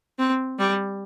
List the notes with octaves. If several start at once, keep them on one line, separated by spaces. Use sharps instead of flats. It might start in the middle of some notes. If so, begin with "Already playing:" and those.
C4
G3